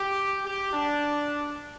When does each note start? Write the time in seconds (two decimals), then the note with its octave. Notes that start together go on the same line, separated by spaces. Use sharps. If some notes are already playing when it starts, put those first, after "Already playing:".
Already playing: G4
0.46 G4
0.73 D4